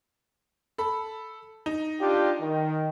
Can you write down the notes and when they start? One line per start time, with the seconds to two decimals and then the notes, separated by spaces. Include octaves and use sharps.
0.78 A4 B5
1.66 D#4
2.00 D4 F4 G4
2.42 D#3